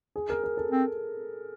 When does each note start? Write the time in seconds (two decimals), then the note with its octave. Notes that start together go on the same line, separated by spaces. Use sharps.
0.16 G#4
0.30 A#4
0.44 A#4
0.57 A4
0.71 C4